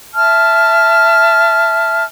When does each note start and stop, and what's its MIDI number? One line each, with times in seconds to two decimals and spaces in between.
0.15 2.03 76
0.15 2.03 81
0.15 2.03 89